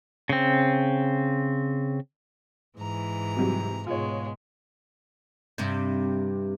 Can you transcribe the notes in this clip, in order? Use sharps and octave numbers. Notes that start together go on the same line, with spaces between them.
C#3 C4
G#2 E3 A#5
C3 F#3 G3
G#2 B2 G#3 F4 C#5
G2 C3